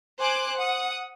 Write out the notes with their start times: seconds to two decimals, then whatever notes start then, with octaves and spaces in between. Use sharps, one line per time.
0.19 C5 G#5 D6 F#6
0.56 F#5 D#6